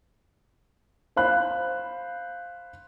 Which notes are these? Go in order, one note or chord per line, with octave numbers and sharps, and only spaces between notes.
C5 F5 B5 F#6